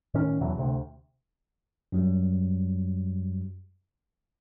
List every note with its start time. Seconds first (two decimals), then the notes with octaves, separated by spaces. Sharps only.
0.14 A2 D#3 C#4
0.40 E2 B2 E3 F#3
0.58 D2 C3
1.92 F#2 F#3 G3